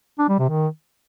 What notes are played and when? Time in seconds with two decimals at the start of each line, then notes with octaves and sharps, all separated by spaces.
0.19 D4
0.29 G3
0.39 C3
0.49 D#3